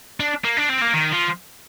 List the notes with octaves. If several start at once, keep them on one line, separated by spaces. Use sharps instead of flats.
D4
A#3
D4
C4
A#3
D#3
F3